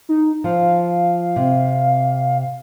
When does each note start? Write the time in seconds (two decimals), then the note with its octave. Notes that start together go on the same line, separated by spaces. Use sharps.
0.09 D#4
0.44 F3 F5
1.36 C3